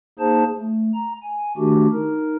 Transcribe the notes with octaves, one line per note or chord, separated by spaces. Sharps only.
A#3 D#4 G#4 C5 A5
A3
A#5
G#5
D#3 A3 D4 F#4 G4
D#4 A#4